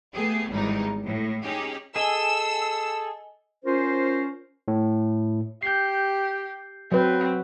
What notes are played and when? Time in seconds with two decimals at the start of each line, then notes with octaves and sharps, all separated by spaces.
0.14 A3 B3 G4 G#4
0.50 G#1 E2 G3 D#4
1.04 A2
1.43 C#4 D#4 G4 G#4
1.96 G#4 A4 D#5 G#5 E6 G7
3.65 C#4 F4 A#4 C5
4.68 A2
5.63 G4 G6 C7
6.92 F#3 C4 B4